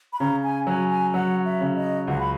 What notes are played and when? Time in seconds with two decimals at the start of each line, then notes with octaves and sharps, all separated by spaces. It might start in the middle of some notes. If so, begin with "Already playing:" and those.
0.13 B5
0.20 C#3 A#5
0.44 G#5
0.67 F#3 G#5
0.90 G#5
1.14 F#3 F#5
1.45 E5
1.61 C#3
1.76 D#5
2.07 C#2 F#5
2.20 B5